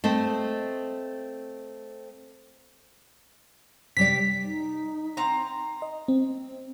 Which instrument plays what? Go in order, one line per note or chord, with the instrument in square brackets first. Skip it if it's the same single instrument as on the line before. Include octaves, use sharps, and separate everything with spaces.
[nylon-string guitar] A3 C4 C5 D#5
[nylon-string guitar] C3 G3 D5 [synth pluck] B6
[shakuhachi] D#4
[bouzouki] C4 A#5
[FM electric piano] D#5
C4